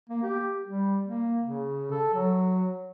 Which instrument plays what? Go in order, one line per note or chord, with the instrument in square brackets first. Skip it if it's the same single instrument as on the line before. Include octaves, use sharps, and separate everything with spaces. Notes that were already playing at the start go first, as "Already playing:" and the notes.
[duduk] A#3
G4
G3
A#3
C#3
A4
F#3